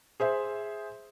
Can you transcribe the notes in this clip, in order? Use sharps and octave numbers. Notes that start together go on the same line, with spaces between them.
G#4 C5 E5